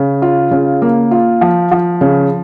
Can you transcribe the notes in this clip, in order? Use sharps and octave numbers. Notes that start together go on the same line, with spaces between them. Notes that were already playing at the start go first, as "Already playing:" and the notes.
Already playing: C#3
F4
C#3
A#3
F4
F3
F3
C#3